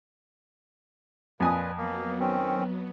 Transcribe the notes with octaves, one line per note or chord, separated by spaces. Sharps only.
F2 A#2 B4 G#5 D#6
F#3 A#3 B3
D#3 C4 C#4